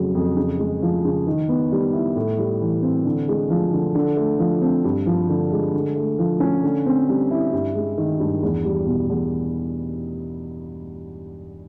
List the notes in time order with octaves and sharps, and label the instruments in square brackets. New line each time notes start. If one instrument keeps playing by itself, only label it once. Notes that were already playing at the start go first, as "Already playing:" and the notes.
Already playing: [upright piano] F2 C#3 F#3
F2
C#3
G#3
F3
C#3
D#3
B3
G3
E4
A2
G3
E3
C4
D3
G#3
F3
D3
D3
A3
F3
C4
G2
F3
D3
G#3
D3
A3
F3
C#4
D3
C4
G3
E4
G2
G#3
D#3
G2
E2
G3
B2
E2